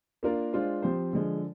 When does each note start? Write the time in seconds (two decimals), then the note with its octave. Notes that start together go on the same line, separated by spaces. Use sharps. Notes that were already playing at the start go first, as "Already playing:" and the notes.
0.23 A#3 D4 F4 A#4
0.53 G#3 D4 F4 C5
0.82 F3 C4 G4 C5
1.13 D3 F3 G#3